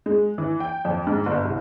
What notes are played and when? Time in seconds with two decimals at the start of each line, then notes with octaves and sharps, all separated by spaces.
0.06 G#3
0.38 E3
0.60 G5
0.85 F2
1.07 G#2
1.26 G1
1.45 C2